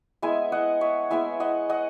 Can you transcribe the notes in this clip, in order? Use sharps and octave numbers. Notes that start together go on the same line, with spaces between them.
G#3 B3 E4 E5 G#5
D#5 F#5
C#5 E5
G#3 B3 E4 E5 G#5
D#5 F#5
D#5 F#5